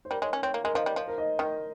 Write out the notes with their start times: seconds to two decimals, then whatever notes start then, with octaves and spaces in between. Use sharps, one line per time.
0.05 C5
0.11 G3 A#4
0.22 G#3 C#5
0.33 C#4
0.43 C4 C#5
0.54 A#3
0.64 G#3 A#4
0.75 F3 D#5
0.86 G3
0.96 F3 C5
1.08 A#4
1.18 D#5
1.39 D#3 A#4